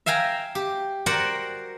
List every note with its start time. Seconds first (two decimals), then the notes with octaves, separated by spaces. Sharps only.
0.06 E5 F5 G5 G#5 A#5
0.55 G4
1.06 F#4 A#4 C5 D5 F#5 G5